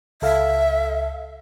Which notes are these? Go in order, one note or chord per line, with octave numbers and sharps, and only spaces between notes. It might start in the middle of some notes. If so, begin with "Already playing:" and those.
C#2 A4 E5 F5